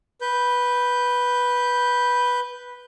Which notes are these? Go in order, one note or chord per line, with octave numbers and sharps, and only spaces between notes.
B4 G6